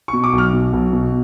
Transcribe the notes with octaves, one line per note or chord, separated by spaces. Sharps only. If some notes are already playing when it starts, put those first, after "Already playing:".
B2 C#6
D6
B1
F6
B2
B1
B2